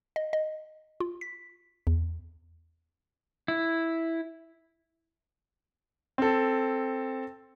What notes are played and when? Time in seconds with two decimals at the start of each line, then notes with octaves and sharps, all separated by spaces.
0.16 D#5
0.33 D#5
1.00 F4
1.21 B6
1.87 E2
3.48 E4
6.18 C4 A4